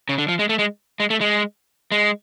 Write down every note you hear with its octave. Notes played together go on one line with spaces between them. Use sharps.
C#3
D3
F3
G#3
A3
G#3
G#3
A3
G#3
G#3